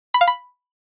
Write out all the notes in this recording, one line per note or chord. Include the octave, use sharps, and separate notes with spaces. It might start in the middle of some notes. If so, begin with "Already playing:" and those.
B5
F5
B5